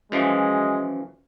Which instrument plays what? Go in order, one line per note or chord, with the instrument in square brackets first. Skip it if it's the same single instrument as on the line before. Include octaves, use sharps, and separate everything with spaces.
[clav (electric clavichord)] F#2 E3 F3 [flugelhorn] G#3